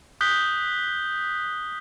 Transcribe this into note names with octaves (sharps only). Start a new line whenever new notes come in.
D#6 F#6 G6 B6 G7